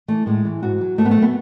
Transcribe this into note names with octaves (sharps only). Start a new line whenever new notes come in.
E3 A3
A2 G#3
E3
G#2 F#4
F#3
G#2 A3
B3
A3
F#3
B3